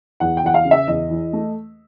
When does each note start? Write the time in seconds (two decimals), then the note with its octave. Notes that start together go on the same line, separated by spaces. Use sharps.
0.20 E2 F#5
0.37 G5
0.44 E2 F#5
0.54 F5
0.65 C#3
0.71 E5
0.88 E2 D#5
1.10 E3
1.33 A3